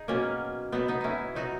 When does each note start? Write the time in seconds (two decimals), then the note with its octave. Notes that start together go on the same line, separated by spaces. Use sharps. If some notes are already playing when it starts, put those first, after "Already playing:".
Already playing: D#4 G#4
0.08 B2 F#3 A#3 C#4
0.72 B2 F#3 B3 D#4
0.88 B3 D#4
1.01 C#4 D#4 E4
1.35 B2 F#3 D#4 F#4